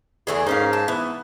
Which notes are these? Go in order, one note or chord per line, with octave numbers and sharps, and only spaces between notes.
E2 E3 A3 G#4
G#2 A#3 C#4 F5
A5
E3 B3